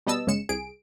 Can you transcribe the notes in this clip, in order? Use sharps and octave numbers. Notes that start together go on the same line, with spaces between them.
B2 G3 B3 D#5 A5 E6
G1 C#3 G#3 C#7 E7
C2 G#4 D7